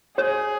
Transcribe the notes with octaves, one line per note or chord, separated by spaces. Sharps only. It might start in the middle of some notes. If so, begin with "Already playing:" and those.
G#4 C#5